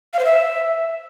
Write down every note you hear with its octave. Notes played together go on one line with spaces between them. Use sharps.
F5
C5
E5